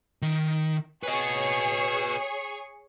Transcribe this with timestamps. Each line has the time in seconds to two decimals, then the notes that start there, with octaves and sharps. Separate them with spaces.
0.22 D#3
1.03 G#4 B4 C#5 D#5 C#6